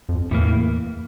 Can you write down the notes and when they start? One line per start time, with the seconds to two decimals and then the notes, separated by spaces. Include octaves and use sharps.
0.09 F2
0.31 E2 A2 E3 A#3